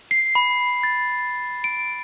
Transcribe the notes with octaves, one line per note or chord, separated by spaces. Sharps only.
C7
B5
A6
D7